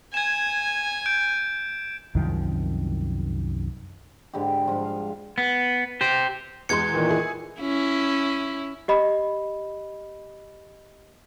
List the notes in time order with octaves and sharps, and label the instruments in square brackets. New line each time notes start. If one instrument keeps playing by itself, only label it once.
[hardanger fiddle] G#5 [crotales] G#6 E7
[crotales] G6 D7
[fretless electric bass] C2 F#2 D#3 F3
[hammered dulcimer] G#2 D3 E4 G4
G#2 F3 G3
F5
[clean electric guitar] B3
G4 C5
[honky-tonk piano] E2 G#3 C6 [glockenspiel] G#6 C#7
[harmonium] A#2 D#3 E3
[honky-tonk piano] E4 G#4
[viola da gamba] C#4 E4
[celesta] G4 D#5 B5